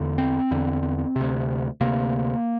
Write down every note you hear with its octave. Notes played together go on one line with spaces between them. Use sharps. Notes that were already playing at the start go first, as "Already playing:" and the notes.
Already playing: E2 D3
C4
E2 D3
D2 C3
D2 C3 A#3